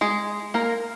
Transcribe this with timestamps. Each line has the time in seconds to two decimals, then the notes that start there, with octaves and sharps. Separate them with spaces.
0.01 G#3 G#4
0.54 A#3 A#4